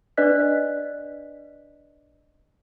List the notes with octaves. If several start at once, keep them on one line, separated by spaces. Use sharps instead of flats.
D4 B4 D5 D#5 F#6 B6